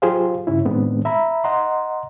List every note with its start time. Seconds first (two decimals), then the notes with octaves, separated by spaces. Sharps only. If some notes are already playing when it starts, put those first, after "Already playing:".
0.02 F#3 F4 G4 G#4 C5 F5
0.47 G2 C#3 C#4 E4
0.65 A2 D#3 G#3 B3 C4 D4
1.05 E5 A#5 B5
1.44 D#5 F#5 A#5 C6